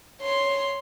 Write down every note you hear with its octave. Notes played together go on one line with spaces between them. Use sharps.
C#5 C6